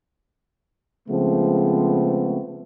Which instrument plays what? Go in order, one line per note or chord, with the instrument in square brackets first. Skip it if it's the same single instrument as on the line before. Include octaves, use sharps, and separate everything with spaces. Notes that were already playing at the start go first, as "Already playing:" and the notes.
[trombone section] C#3 F3 G#3 A3 B3 C4